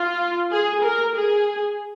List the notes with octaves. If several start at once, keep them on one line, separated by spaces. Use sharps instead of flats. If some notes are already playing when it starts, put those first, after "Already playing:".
Already playing: F4
G#4
A#4
G#4